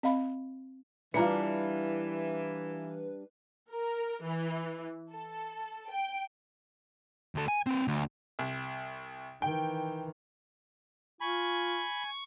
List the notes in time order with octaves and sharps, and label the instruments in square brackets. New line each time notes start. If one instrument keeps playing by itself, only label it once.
[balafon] C4 D#5 F5 B5
[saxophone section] E3 [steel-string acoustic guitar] G3 D4 [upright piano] F4 A#5 C#7 [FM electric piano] B4
[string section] A#4
E3
A4
G5
[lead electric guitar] D2 A4
G#5
C4 B4
D2
[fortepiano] C2
[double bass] D#3 E3 [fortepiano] G5
[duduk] F4 [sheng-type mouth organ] G#5 [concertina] B5 [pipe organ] C#6